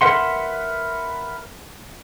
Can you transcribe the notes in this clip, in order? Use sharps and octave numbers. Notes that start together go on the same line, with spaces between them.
A#4 B4 E5 F#5 C6